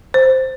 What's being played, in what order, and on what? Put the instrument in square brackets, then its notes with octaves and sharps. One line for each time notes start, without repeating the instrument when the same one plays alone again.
[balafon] C5